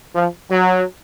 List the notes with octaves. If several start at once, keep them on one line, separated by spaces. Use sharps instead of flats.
F3
F#3